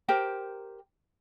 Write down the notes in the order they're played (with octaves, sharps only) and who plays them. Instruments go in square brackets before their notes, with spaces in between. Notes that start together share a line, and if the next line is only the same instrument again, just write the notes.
[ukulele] G4 A#4 C5 G5